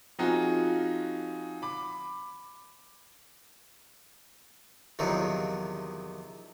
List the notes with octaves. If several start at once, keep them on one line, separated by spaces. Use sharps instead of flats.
F3 C4 D#4 F4 F#4 G#4
B5 D6
E2 C3 D#3 F3 F#3 G#3